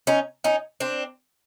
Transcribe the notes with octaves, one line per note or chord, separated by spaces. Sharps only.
C#4 D#4
C#4 D#4
C4 D4